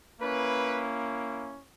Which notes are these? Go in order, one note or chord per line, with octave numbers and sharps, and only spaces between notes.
A#3 C#4 E4 B4